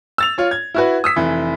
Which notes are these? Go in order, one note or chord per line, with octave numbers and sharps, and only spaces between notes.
E6 A6 F7
F4 C#5
G#6
E4 F#4 B4
D#6 E6 B6
F1 E3